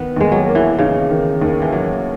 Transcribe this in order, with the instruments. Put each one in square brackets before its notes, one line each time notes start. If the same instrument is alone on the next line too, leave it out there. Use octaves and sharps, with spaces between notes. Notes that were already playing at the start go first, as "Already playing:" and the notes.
Already playing: [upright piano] D#3 [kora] B3
[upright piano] D#2 [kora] G#3
[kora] F#3
[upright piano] A#3
[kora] E3
[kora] C#3 [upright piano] D#4
[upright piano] D#3
D#2
[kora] E3
[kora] F#3 [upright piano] A#3